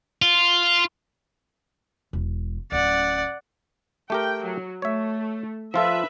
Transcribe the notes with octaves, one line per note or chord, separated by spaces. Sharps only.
F4
E1
D1 C#4 D5 F#5
A3 G4 A#4 G5
F#3
A3 C#5 E5
F3 F4 A4 B4 E5